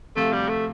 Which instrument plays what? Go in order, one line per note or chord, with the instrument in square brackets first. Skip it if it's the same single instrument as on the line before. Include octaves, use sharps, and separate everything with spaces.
[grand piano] D2 C3 F3 C4 F4 [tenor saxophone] A3
[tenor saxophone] G3
A3